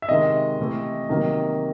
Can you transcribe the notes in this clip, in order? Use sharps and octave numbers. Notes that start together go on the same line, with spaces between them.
E5
C3 D#3 G#3 D#5
C3 E3 A3
C3 D#3 F#3 A#3